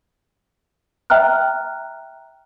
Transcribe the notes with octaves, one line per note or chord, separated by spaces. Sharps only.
E5 G5 A#5 F6 F#6